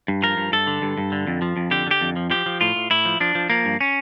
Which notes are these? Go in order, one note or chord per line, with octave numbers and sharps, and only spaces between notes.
G2
F3 A#4
G2
G2 A4
D3
G2
G2
D3
F2
F3
F2
D3 G4
D3 G4
F2
F3
F3 G4
F3
A2 F4
A2
A2 E4
F3
F3 D4
F3
F3 A#3
G2
C#4